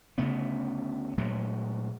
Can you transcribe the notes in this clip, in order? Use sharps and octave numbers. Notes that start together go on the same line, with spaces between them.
D2 C#3 A3 B3
A#2 F#3 G#3 A3